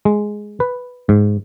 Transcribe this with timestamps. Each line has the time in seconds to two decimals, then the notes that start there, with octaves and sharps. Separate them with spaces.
0.05 G#3
0.60 B4
1.09 G#2